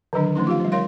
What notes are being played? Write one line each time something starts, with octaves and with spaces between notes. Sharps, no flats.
D3 D#3 F#3 D4
F3 A3 C#4 D#4
F4 G4 F5
F3 G3
A#4 C#5 F5 C6